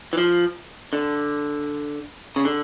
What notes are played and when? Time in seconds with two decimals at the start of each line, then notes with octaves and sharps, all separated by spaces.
0.13 E3
0.18 F3
0.93 D3
2.36 C#3
2.45 D3